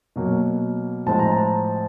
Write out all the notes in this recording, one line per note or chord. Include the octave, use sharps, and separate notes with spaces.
B2 F#3 A#3
A2 F3 G#3 C4 A5
A#5
A5